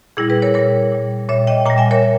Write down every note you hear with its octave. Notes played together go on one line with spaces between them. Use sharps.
A#2 G3 E4 G#4
G#4 B4
A#4 C#5
A#2 G3 A#4 C#5
A#2 G3
A#2 G3 C#5 E5
D#5 G5
A#2 G3 G5 A#5
E5 G#5
A#4 C#5